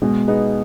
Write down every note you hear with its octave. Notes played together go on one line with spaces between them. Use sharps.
B2 G#3
B3 D#4 G#4